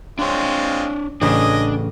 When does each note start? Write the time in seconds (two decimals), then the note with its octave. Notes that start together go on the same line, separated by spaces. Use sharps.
0.19 G#3 C4 D4 F4 C#5
1.21 A1 C#3 D4 D#5 G#5